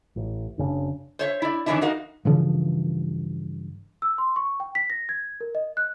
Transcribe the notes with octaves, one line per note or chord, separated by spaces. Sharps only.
A1
F#1 C#3 C#4 D4
C5 C#5 E5
E4 D5
F#2 D#3 E3 C#4 D4 E4
D#4 F#4 A#4 F5
G2 C#3 E3 F3
E6
C6
C#6
G5
B6
A#6
G#6
A#4
D#5
F#6